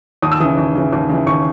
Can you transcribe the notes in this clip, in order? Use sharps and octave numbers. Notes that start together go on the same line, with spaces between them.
D#2 D#6
E6
C#3 E3 D#6
D#2
C#3 E3
D#2
C#3 E3
D#2 C#6